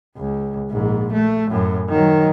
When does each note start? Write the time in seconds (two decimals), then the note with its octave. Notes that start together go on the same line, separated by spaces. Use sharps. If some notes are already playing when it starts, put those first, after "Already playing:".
0.17 C#2
0.70 A#1 G#2
1.13 A3
1.51 F#2 A2
1.89 D#3 F#3